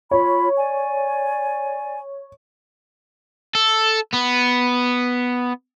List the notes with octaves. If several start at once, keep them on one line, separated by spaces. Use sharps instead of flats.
F4 C#5 B5
D5 G#5
A4
B3